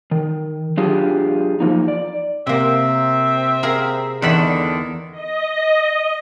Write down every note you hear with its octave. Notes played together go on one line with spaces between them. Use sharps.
D#3
F#3 D4 F4 G4 G#4
F3 A#3 D#4
D5
C3 A#3 C4 E5
G#4 A#4 F5
E2 D3 D#3 E5 B5
D#5